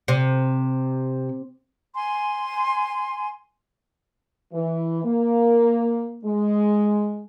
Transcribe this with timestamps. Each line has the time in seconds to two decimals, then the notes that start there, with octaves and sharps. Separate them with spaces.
0.08 C3
1.94 G#5 C6
4.53 E3
5.05 A#3
6.25 G#3